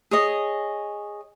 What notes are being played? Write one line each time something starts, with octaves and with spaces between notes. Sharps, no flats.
G#4 C#5 D#5